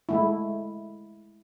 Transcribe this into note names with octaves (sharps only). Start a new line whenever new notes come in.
G#3 A3 E4